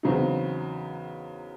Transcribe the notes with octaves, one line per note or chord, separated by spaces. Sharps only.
E2 C#3 F#3 C4 D#4